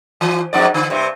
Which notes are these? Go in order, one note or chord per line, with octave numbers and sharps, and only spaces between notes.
E3
F2 G#2 D5
D3
G2 C3